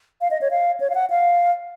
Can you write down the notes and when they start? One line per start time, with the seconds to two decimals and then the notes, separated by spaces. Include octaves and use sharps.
0.21 F5
0.31 D#5
0.41 C#5
0.51 F5
0.80 C#5
0.90 F5
0.95 F#5
1.10 F5